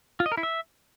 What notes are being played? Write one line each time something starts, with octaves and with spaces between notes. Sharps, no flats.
F4
D#5
A#4
E4
E5